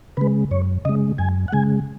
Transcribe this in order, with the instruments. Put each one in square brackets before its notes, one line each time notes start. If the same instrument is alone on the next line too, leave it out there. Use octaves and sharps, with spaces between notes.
[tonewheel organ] C#3 G#3 B4
F#2 C#5
C#3 G#3 D#5
F#2 G#5
F#5
C#3 G#3 G#5